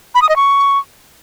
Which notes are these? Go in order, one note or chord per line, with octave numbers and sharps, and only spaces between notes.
B5
D#6
D#5
C#6